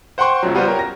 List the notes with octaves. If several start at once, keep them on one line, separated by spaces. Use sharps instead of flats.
C5 F#5 G5 C6 C#6
C#2 C#3 F3 F#3
G3 B3 F4 F#4 C5
C#4 G4 A#4
A#6